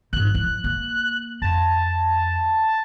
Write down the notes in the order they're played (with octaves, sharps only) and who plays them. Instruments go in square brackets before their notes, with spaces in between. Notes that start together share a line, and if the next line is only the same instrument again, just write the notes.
[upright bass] G#2 D#3 [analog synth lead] F#6
[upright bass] F3 E4
A#3
[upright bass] F2 [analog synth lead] A5